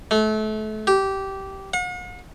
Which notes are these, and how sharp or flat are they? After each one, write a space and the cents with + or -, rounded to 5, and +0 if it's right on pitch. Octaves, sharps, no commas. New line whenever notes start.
A3 -30
G4 -15
F#5 -45